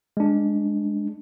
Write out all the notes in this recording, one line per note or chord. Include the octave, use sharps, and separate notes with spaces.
G#3 D4